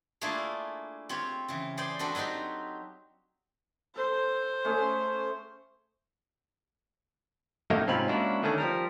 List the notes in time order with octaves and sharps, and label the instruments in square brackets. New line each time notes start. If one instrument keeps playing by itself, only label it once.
[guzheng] A3 A#3 D4 E4 F4 G#4
C4 F4 G4 C#5
C#3 E3
G#4 C5 D5 G5
C4 D4 F#4 A4 B4
F#3 C4 D#4 F#4 G4
[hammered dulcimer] A4 [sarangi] C5
[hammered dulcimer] A3 C#4 G#4
[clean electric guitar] F#2 A2 A3 A#3 D#4
G#2 C3 C4 C#4 F4 B5
G#3 A#3 C#4 D4 E4 F#4
D3 D#3 A3 A#3 C#4 D4
F3 G3 A#4